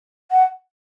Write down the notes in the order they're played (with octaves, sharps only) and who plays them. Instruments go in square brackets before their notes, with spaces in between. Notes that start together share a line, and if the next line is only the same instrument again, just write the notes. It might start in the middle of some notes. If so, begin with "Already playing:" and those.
[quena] F#5